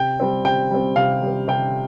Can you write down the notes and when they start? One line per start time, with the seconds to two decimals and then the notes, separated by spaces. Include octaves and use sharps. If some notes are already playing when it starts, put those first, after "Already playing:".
Already playing: C3 G5
0.20 G3 C4
0.44 C3 G5
0.71 G3 C4
0.96 C3 F5
1.22 G3 C4
1.48 C3 G5